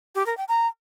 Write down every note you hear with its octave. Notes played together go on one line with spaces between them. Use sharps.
G4
A#4
G5
A#5